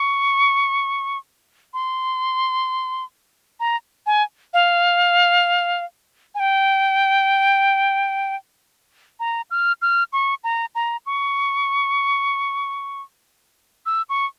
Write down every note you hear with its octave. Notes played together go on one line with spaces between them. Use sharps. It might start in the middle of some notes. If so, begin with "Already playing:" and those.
Already playing: C#6
C6
A#5
G#5
F5
G#5
G5
A#5
F6
F6
C#6
A#5
A#5
C#6
E6
C#6